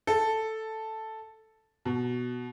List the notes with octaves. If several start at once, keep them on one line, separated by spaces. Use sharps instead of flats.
A4
B2